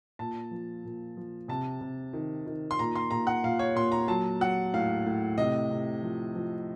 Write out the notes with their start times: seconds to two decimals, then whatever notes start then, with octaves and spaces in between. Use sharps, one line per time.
0.19 A#2 A5
0.51 F3
0.85 A#2
1.17 F3
1.48 C3 A5
1.81 C3
2.13 D#3
2.46 D#3
2.71 C6
2.79 A#2 A#5
2.96 C6
3.11 A#2 A#5
3.27 F#5
3.44 A#2 F5
3.59 C#5
3.75 A#2 C6
3.92 A#5
4.08 F#3 A5
4.41 F#3 F#5
4.74 A2 F5
5.06 A2
5.38 C3 D#5
5.71 C3
6.02 F3
6.36 F3